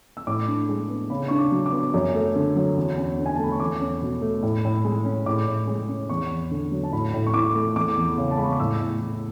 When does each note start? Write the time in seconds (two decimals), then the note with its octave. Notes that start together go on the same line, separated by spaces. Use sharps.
0.17 E6
0.27 A2 D6
0.48 D4
0.69 G#3
0.90 B3
1.10 C#3 B5
1.28 D4 C#6
1.39 D6
1.52 F#3
1.66 D6
1.72 B3
1.94 F#2
2.14 A3
2.36 D3
2.56 F#3
2.77 E2
2.98 C#4
3.18 D3
3.26 G#5
3.35 A5
3.39 A3 B5
3.52 C#6
3.60 E2 D6
3.80 C#4
4.02 B2
4.22 A3
4.42 A2
4.64 A2
4.84 G#3
5.05 C#4
5.26 A2 D6
5.48 A2
5.67 G#3
5.88 C#4
6.10 E2 C#6
6.31 E2
6.51 D3
6.72 F#3
6.84 A5
6.92 A2 B5
7.14 A2
7.27 C#6
7.34 E3 D6
7.55 A3
7.76 E2 D6
7.97 E2
8.18 C#3
8.31 A5
8.37 G#3 B5
8.45 C#6
8.52 D6
8.59 A2 E6
8.79 A2
9.01 E3